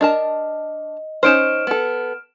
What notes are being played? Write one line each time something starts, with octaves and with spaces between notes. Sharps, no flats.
D4 A#4 D#5 A5
C#4 D#4 C5 F6 D7 E7
B3 A4